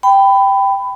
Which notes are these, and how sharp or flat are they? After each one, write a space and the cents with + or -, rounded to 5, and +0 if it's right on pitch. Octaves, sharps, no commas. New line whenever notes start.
G5 +0 B5 +20